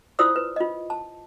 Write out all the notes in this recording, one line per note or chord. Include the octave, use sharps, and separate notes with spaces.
E4 F4 C5 D5 D#6 E6
B4
F4 D#5
A5